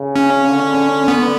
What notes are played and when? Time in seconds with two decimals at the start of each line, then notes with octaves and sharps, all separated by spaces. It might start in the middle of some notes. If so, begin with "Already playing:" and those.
Already playing: C#3
0.16 C#4
0.46 D3
1.08 D3 B3